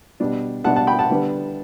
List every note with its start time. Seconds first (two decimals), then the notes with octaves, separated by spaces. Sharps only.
0.20 B2 G3 D4
0.64 B2 G3 D4 F#5 A5
0.76 F#5 A5
0.87 G5 B5
0.99 F#5 A5
1.10 D3 G3 B3 D4